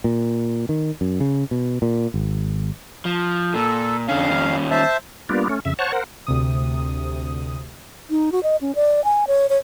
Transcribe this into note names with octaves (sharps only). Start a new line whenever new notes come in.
A#2
D#3
F#2
C#3
B2
A#2
G#1
F3
A#2 A4
F2 D3 C#4 F5
D#2 C#4
C5 E5 A5
G3 A#3 B3 D4 F4
A3 C#4
F2 C#3 E5
C5 C#5 F#5 A5 C#6
A#4 C5 F#5
D2 C3 D#6
D#4
F#4
D#5
C#4
D5
G#5
C#5
C#5